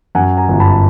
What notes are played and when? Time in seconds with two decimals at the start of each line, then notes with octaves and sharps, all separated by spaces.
0.15 F#2 F#5 G#5
0.37 G#5 A#5
0.49 G1
0.60 A5 B5